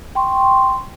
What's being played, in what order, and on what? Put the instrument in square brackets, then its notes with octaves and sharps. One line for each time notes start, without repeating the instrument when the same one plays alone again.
[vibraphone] G5 C6 C#6